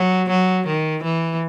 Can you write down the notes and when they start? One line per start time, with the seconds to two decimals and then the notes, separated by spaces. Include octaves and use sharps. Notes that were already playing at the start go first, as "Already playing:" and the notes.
Already playing: F#3
0.29 F#3
0.67 D#3
1.03 E3